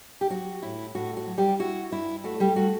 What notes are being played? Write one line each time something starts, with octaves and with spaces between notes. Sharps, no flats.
G4
F#3 F#4
A2 E4
A2 F#4
F#4
F#3
G3 G4
E4 F#4
G2 E4
A3 F#4
G3 G4
A3 F#4